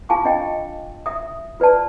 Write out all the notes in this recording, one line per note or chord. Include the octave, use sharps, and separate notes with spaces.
F4 F5 G#5 A5 C#6 D6
D4 D#5 G5
E5 D#6
F4 B4 D5 A5